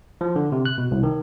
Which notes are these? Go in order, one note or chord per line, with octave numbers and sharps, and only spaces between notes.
F3
D3
C3
F#6
B2
C2
D#3